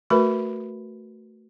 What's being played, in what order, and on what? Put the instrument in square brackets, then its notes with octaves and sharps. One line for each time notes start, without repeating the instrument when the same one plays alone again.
[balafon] A3 F#4 A#4 B4 B5